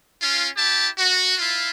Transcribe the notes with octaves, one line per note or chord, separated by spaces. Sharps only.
C#4 F4
E4 G4 A5
F#4
E4 F4